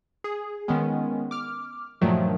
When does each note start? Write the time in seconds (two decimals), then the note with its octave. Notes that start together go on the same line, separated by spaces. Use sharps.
0.24 G#4
0.68 D#3 G#3 B3 C#4
1.31 D6 F6
2.01 G2 A#2 D#3 F3 F#3 A3